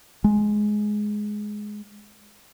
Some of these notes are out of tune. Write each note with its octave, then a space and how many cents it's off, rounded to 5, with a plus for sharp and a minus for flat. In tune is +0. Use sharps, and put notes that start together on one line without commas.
G#3 +10